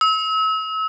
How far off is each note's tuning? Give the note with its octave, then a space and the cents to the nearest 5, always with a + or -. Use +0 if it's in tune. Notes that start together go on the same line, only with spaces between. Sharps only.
E6 -35